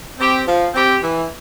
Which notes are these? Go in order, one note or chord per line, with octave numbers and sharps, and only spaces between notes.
C4 G4
F3
C4 G4
E3